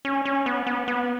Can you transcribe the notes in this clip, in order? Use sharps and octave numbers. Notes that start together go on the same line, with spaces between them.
C#4
C#4
B3
B3
B3